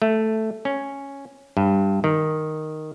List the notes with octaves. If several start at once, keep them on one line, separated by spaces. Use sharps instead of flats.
A3
C#4
G2
D#3